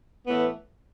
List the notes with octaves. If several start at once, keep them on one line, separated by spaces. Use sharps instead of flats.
A2 E3 A3 B3